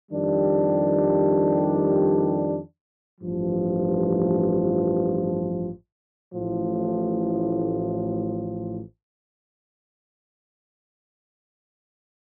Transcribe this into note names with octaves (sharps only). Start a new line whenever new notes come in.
F2 D#3 G3 D4 G4
A1 G2 F3
A1 A2 F3